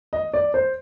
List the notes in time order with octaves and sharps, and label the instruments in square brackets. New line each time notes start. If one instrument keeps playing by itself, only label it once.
[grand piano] D#5
D5
C5